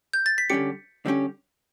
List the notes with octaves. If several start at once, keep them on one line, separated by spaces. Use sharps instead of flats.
G6
A6
B6
D3 G3 C#4 G4 C#7
D3 G3 C#4 G4